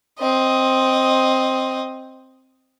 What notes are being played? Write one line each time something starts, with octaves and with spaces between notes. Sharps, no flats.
C4 D#5